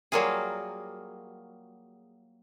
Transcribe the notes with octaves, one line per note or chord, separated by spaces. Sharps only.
F#3 G3 A#3 F4 G#4